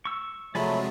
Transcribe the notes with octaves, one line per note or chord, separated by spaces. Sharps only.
C#6 E6
C3 F3 F#3 G#3 A3 D5 G#5 B5